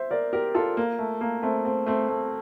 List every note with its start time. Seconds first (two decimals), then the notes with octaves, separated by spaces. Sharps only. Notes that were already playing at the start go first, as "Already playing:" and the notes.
Already playing: C5 E5
0.11 A#4 D5
0.33 G4 A#4
0.55 F4 A4
0.77 A#3
0.99 A3
1.21 A#3
1.43 A3 C4
1.65 A3 C4
1.86 A3 C4
2.09 A3